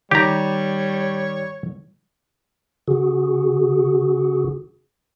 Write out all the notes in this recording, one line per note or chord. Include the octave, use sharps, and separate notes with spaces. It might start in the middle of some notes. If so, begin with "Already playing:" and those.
D#3 G3 G4 C#5 A#5
C#3 F#4 G#4